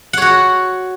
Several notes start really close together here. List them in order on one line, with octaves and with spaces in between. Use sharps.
F#5 C#5 F#4